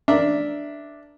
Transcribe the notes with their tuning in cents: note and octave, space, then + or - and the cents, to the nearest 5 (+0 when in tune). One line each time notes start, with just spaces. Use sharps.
D4 +0 A#4 +0 E5 +0